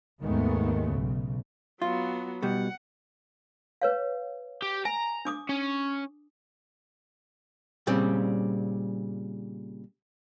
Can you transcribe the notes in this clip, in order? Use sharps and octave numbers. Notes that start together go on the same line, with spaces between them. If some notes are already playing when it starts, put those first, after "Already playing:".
D#2 G#2 D#3 G#3 A3 B3
B1 C#3
F#3 B3 F4
B2 G3 F#5
B4 C#5 F5
G4
G#5 A#5
D4 D6 D#6
C#4
A#2 C#3 G3 C4